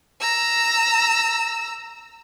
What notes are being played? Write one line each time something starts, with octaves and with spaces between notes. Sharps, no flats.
A#5 E6